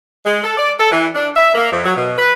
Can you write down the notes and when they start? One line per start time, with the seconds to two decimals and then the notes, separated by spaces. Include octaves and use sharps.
0.25 G#3
0.43 A4
0.57 D5
0.78 A4
0.90 E3
1.15 D4
1.36 E5
1.54 A#3
1.71 F2
1.84 F#3
1.96 B2
2.16 B4